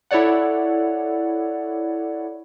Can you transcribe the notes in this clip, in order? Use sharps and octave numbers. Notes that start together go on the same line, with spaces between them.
E4 A4 C#5 D5 F#5